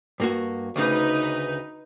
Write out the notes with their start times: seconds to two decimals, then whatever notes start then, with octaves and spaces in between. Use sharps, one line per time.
0.20 G2 A#3 F#4
0.76 D2 C#3 D#4 B4